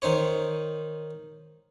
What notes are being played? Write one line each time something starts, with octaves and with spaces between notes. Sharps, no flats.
D#3 D#4 C5 C#5